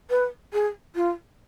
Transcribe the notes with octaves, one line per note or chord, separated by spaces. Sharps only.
B4
G#4
F4